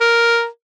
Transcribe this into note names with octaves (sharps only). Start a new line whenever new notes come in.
A#4